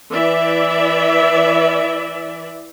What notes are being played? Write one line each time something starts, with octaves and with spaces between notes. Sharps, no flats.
E3 D5 E5